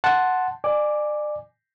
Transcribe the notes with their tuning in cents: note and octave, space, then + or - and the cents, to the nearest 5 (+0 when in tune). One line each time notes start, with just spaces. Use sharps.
F#5 +0 A5 +0 C6 +0
D5 +35 G#5 +0 D6 +0